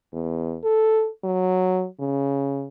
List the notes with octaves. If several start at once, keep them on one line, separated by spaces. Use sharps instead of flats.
E2
A4
F#3
C#3